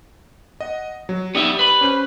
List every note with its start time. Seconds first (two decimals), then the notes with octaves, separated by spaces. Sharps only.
0.60 D#5 F#5
1.09 F#3
1.35 B3 D#4 G4 D5 E5
1.59 B4 B5
1.81 C#4 C5 F#6